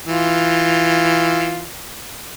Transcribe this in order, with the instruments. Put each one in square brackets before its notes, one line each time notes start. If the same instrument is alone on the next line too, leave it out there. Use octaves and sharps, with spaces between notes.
[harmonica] E3 F4